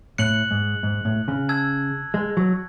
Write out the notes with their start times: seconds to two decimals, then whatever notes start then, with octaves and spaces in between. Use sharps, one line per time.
0.18 A2 F#6 C#7 F#7
0.51 G#2
0.83 G#2
1.05 A2
1.28 C#3
1.49 A5 E6 G#6
2.14 G#3
2.37 F#3